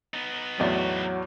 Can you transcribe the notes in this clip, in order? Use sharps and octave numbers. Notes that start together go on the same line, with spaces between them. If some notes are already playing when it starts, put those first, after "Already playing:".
B3 D#4
E2 A2 F#3 D5